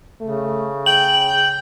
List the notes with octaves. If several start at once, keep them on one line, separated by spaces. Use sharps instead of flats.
C#3 A3
G#4 G5 F#7